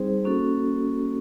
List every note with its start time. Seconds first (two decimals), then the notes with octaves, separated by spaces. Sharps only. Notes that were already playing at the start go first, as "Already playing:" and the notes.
Already playing: G3 C4 D#4 G#4 C5
0.25 A#3 C#4 F#4 A4